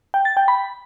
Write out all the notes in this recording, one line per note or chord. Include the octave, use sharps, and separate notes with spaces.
G5
A6
G5
B5